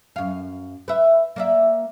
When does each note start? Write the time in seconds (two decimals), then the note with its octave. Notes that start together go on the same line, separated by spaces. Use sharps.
0.16 F#2 F5
0.88 B4 E5
1.36 A#3 D5 E5